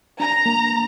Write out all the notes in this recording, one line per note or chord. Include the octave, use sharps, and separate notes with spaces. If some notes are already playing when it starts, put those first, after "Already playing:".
D4 A#5
A#3